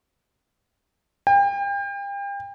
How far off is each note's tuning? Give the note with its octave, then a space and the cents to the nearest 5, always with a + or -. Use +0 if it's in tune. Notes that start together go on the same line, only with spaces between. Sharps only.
G5 +35